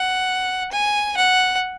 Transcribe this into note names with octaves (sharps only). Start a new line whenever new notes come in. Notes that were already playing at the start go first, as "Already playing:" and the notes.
Already playing: F#5
G#5
F#5